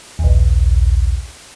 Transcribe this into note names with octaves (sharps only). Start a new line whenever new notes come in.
A#1 D#2